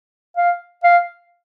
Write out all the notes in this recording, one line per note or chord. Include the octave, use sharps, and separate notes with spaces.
F5
F5